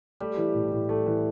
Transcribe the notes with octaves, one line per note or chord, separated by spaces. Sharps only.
G3 A3
E3
A2
A2
A3
E3